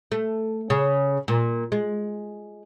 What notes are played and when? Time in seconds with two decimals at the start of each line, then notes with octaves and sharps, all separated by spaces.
0.12 A3
0.70 C#3
1.28 A#2
1.72 G#3